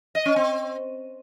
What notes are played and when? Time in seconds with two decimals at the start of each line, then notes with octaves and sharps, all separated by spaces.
0.15 D#5
0.26 C#4
0.36 C4